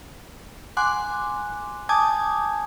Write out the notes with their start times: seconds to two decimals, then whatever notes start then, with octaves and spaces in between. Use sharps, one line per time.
0.77 F#5 G#5 C6 D6 F#6
1.89 G#5 A5 D6 D#6 G6 G#6